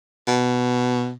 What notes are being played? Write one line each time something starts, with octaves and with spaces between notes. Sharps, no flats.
B2